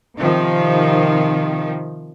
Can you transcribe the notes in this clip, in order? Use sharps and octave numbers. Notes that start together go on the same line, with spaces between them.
C3 D#3 F3